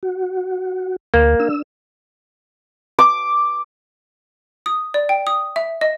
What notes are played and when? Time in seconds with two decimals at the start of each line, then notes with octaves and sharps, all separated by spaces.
0.03 F#4
1.14 D2 A#3
1.40 D4 E6
2.99 D6
4.66 D#6
4.94 D5
5.09 G5
5.27 D#6
5.56 E5
5.81 D#5